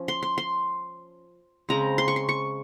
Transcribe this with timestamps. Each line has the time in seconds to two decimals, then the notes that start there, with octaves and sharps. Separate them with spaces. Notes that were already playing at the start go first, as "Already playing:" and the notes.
Already playing: F3 C#4
0.08 C6
0.23 C6
0.38 C6
1.69 C#3 G#3 C4 A#5
1.98 C6
2.08 C#6
2.16 C6
2.29 C#6